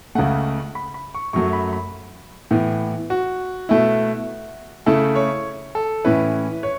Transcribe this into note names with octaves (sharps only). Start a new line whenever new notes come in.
C#2 C#3 A3 F#5
B5
B5
C#6
F#2 F#3 A3 C#6
B5
B5
A2 E3 B3
F#4
B2 A3 E4
C#3 A3 E4 A4
C#5
A4
A2 E3 C#4 E4 B4
C#5